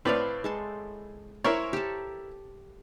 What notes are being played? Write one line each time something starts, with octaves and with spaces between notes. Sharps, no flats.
A2 C4 B4 C#5 D5 F5
G#3 A4 C6
E4 A#4 C5 C#5 G#5 C6
G4 A4